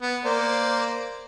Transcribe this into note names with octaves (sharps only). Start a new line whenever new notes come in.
B3
A#3 C5 D5